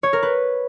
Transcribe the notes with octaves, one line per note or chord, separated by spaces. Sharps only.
C#5
A#4
B4